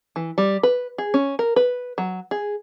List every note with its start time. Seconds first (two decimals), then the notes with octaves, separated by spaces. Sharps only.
0.16 E3
0.38 G3
0.63 B4
0.98 G#4
1.14 C#4
1.39 A#4
1.56 B4
1.98 F#3
2.31 G#4